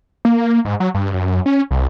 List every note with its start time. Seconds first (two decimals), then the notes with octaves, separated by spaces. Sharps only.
0.25 A#3
0.65 G#2
0.80 F#3
0.94 G2
1.14 F#2
1.46 C#4
1.71 C2